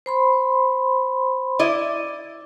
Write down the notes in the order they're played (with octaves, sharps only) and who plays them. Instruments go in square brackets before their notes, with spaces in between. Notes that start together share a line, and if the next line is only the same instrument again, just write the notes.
[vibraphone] C5 B5 C6
[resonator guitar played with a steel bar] E4 D5 D#5